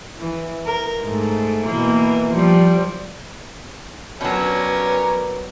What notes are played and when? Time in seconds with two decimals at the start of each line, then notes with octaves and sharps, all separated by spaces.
0.19 E3
0.66 A#4
1.04 G#2 A3
1.66 B2 E3 A#3
2.32 F3 G3
4.21 B2 F#3 C#4 A#4 B4 D5